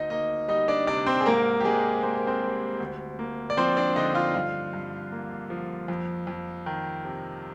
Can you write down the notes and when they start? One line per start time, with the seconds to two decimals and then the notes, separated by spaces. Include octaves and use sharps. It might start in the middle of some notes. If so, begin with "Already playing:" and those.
Already playing: D2 D#4 D#5
0.10 A#3 D#4 D#5
0.48 G3 D#4 D#5
0.68 D4 D5
0.87 C3 D4 D5
1.06 C4 C5
1.21 G#4
1.26 G#2 A#3 A#4
1.60 G4
1.65 G#2 G#3 G#4
2.03 A#3 C5
2.15 A#4
2.27 C4 C5
2.42 G3
2.80 D2
3.19 A#3
3.50 D5
3.57 F3 C4 C5
3.77 D4 D5
3.96 D3 D#4 D#5
4.15 F4 F5
4.34 G2 F4 F5
4.73 G2
5.12 A#3
5.50 F3
5.88 F2
6.27 F2
6.66 D#3
7.05 C3